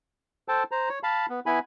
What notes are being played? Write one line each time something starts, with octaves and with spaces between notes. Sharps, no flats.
A4 C5 G5 A5
C5 A#5
C#5
F5 A5 B5
B3
B3 E4 G#5 B5